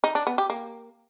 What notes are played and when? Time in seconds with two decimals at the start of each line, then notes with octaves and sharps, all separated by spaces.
0.04 D#4
0.15 D4
0.27 B3
0.38 G4
0.50 A#3